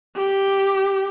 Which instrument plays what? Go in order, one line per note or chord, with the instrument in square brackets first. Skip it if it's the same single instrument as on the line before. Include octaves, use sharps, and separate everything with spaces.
[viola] G4